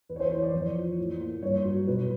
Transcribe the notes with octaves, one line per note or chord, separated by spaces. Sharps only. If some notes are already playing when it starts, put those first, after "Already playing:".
E2 B4
C#5
C5
E3 C#5
D5
F2 C#5
F3
A2
A#3
G2 C#5
F#3
B2 B4